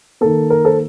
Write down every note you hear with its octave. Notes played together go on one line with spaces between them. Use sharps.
D#3 A#3 A4
A#4
A4 C5